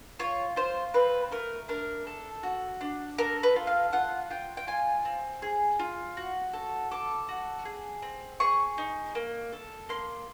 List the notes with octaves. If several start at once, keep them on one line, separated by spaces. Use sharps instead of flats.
F4 C#5
F4 C5
C4 B4
A3 A#4
D4 A#4
A4
F#4
D4
A4 A#4
B4
F4
F5
F4 F#5
F4 G5
G5
F4 G#5
C4
G#4
F4
F#4
A4
A4 D6
F#4
G#4
C4
G#4 C#6
D#4
A#3
A4
A#3 C6